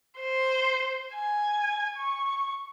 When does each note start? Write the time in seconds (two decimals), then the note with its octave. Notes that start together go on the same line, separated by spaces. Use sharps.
0.20 C5
1.15 G#5
1.96 C#6